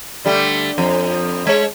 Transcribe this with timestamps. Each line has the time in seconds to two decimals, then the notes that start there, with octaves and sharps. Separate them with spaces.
0.25 D3 G3 A3
0.78 F2
1.47 G#3 C#5